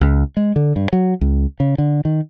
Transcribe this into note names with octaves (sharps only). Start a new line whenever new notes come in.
C#2
G#3
D3
G2
F#3
C#2
C#3
D3
D#3